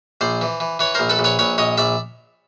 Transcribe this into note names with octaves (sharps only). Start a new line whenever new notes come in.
A#1 C5 D5
E3
E3
E3 B4 C#5
A#1 A#4 C5
A4 B4
A#1
B4 C#5
A#1 B4 C#5
A#1 C#5 D#5
A#1 D5 E5